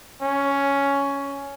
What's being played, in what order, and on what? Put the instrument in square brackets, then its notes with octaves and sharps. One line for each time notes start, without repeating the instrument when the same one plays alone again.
[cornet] C#4